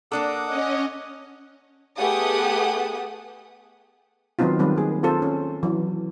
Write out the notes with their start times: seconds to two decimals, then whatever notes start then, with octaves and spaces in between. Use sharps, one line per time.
0.12 A#3 D4 A4 F#5 D6 D#6
0.45 C#4 D#5
1.97 A3 B3 G4 G#4 F#5 D#6
4.39 D#3 F#3 B3 C4 D#4 F4
4.59 D#3 G3 C4 B4
4.76 A#3 G#4
5.03 C4 F4 A4 C5
5.22 C#4
5.63 E3 F#3